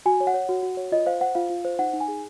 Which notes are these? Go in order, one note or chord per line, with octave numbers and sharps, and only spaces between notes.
F#4 G#5
C#5
F#5
C#5
F#4
F#4
C#5
F4 D#5
C5 F5
C5 F#5
F4 F5
F4
C5
D#4 F#5
D#4
G#5
G#4